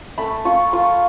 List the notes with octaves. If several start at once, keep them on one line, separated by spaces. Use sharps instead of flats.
A3 B5
F4 C#6
F4 C#6